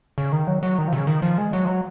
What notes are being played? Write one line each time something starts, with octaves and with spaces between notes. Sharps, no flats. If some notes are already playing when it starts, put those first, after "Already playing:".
C#3
D#3
F#3
F#3
D#3
F3
C3
C#3
D#3
F3
G#3
F#3
F3
F#3